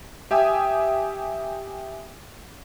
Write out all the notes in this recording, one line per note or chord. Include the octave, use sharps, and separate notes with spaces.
G4 E5 G5 G#5 D#6